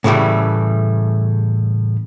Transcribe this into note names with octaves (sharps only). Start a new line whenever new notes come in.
A2 C#3 E3 F3 G3 A3